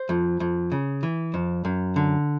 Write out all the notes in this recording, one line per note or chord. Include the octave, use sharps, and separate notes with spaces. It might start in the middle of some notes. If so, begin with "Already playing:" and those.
Already playing: C5
F2
F2
C#3
E3
F2
F#2
D3